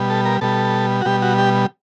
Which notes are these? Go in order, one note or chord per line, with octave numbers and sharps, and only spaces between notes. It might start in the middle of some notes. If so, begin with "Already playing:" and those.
Already playing: B2 G3
A4
A#4
B2 G3 A4
F#4
B2 G3 G4
F#4
G4